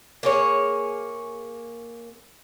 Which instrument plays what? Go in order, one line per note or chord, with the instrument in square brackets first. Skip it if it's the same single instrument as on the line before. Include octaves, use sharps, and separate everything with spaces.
[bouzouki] A#3 G#4 C#5